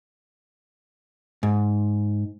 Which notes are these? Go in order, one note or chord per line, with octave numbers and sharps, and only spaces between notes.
G#2